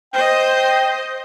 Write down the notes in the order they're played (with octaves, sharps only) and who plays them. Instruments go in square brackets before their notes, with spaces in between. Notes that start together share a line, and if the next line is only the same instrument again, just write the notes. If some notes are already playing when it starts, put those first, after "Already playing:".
[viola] C5 D#5 [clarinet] G5